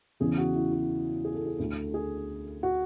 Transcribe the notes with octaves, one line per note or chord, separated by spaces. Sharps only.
E2 C#3 E3 G#4
F#4
E4
F#4
G#4
A4
G#4
D2 D3 A4
G#4
F#4